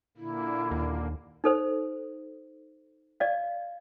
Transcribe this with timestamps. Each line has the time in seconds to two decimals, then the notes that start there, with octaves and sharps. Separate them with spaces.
0.17 A#2 D3 A#3 E4
0.71 D#2
1.44 D#4 A4 C5
3.20 D5 D#5 F5